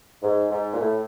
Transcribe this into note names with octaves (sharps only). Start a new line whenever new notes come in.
G#2
G#2
A#2
A2